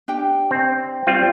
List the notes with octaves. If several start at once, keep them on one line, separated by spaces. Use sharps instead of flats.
D4 G4 G5
C4
G3 C4 F4